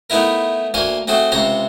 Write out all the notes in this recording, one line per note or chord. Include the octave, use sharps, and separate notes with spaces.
A3 B3 D#4 E4 A#4
D2 A#3 C5 F5 G#5 C#6
A3 C4 F#4 G#4 C5
C#2 C3 C5 C#5 A#5 C6